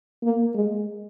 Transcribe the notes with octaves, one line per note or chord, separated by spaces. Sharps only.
A#3
G#3